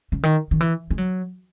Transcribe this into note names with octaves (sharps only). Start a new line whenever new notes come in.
C#3
D#3
D#3
E3
G#3
F#3